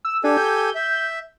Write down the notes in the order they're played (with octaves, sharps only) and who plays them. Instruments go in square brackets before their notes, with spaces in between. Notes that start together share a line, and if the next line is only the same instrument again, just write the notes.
[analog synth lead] E6
[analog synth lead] D4 [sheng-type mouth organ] G4 A4 G#5
[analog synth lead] G6
[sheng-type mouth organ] E5